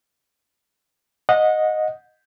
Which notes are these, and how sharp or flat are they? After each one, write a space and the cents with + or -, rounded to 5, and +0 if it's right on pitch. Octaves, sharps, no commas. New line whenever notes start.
D#5 +0 F#5 -25